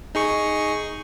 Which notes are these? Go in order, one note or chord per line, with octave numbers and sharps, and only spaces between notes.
D#4 G#4 C#6